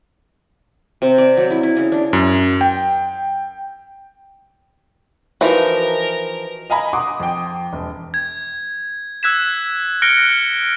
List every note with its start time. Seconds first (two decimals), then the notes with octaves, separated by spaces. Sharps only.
1.02 C3
1.18 D5
1.37 F#3
1.51 E4
1.63 E4
1.77 C#3
1.92 D4
2.13 F#2
2.61 G5
5.41 E3 F3 D#4 F#4 A#4 B4 A5
6.70 D#5 F5 G#5 A#5 B5
6.93 F#5 C6 D6 D#6
7.20 F2 G5
7.73 E1
8.14 G#6
9.23 E6 F#6 G#6 B6 E7
10.02 F6 F#6 A#6 C#7 D7 G7